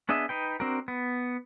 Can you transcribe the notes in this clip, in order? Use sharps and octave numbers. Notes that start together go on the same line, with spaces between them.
B3 D4 G#4 D#5 E5
D#4 B4 G5
C4 D4 F#4 A#4
B3